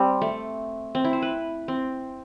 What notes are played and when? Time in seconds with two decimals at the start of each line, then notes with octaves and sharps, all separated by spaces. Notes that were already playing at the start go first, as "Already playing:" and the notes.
Already playing: G3 C4
0.22 A3
0.95 C4
1.05 E4
1.13 C5
1.22 B4
1.68 C4